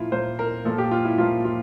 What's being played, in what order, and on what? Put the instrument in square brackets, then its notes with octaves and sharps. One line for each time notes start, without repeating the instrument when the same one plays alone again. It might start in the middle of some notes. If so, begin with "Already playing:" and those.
Already playing: [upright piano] A#2 F3 A#3 [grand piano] E4 F4
[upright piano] A#2 F3 A#3 [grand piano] C5
[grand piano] A#4
[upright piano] A#2 F3 A#3 [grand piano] A4
[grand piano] G4
F4
E4
[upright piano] A#2 F3 A#3 [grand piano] F4
[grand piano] F4